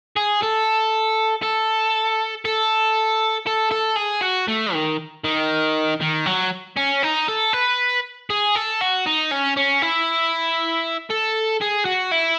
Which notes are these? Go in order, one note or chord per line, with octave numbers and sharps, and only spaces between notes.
G#4
A4
A4
A4
A4
A4
G#4
F#4
A3
D#3
D#3
D#3
F#3
C#4
D#4
A4
B4
G#4
A4
F#4
D#4
C#4
C#4
E4
A4
G#4
F#4
E4